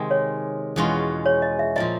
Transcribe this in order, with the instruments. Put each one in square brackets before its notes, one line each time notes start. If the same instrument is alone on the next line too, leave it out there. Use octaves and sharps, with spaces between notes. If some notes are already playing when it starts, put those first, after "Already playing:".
Already playing: [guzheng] C3 D#3 G#3
[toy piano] C#5
[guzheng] E2 B2 G#3 C#4 F4
[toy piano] C#5
D#5
E5
[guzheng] A#2 F3 A#3 [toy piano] D#5